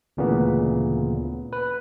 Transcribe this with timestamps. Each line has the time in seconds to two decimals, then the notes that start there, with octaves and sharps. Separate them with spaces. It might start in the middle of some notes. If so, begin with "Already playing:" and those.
0.17 D2 A#2 C#3 E3 B3
1.53 B4